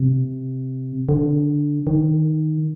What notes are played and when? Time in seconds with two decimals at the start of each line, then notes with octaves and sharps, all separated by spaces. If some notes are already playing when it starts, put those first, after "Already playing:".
Already playing: C3
1.09 D3
1.87 D#3